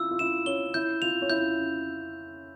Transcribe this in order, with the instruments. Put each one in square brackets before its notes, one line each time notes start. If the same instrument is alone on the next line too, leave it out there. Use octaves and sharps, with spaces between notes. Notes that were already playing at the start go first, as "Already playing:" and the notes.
Already playing: [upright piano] E4 F4 [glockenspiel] E6
[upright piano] F4
[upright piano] E4 [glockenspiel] E7
[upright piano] C#4 [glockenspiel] G7
[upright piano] E4 [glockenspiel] G6
[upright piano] F4 [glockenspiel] F7
[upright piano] C#4
[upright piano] E4 [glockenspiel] G6